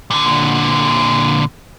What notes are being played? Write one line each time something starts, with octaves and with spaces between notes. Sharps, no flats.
A#2 D3